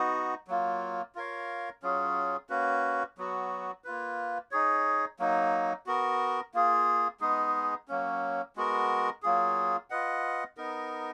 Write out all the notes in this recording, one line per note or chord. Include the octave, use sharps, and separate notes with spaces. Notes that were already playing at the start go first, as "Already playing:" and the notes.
Already playing: B3 D#4 F#4
F#3 A#3 F4
F4 A#4 C#5 F5
F#3 C#4 F4 G#4
A#3 C#4 F#4 B4
F#3 B3 F#4
A#3 F4 B4
D#4 G#4 C#5
F#3 A#3 D#4
B3 F#4 A#4
A#3 F4 G#4
G#3 B3 D#4 G#4
F#3 A#3 C#4
G#3 B3 F#4 A#4
F#3 A#3 F4 G#4
F4 B4 D#5 F#5
B3 D#4 A#4